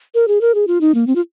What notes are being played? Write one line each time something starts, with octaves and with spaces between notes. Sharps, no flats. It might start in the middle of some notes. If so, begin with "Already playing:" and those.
A#4
G#4
A#4
G#4
F4
D#4
A#3
C4
F4